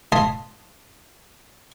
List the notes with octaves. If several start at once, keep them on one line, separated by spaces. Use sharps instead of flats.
D#5 F5 G#5 A5 B5 C6